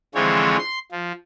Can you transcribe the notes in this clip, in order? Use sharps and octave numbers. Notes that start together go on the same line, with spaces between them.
D3 E3 F3 G#3 C4 C#5
C6
F3